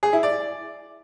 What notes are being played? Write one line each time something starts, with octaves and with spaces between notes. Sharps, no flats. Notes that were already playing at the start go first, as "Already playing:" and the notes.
G#4
E4
D5